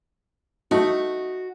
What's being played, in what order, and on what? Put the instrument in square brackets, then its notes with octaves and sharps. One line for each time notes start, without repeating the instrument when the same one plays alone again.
[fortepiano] A3 D#4 [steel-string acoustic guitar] F#4